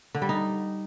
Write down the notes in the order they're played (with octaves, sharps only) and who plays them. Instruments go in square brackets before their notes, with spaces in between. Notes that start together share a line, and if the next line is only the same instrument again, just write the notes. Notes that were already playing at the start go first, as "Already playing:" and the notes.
[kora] D3
G3
D#4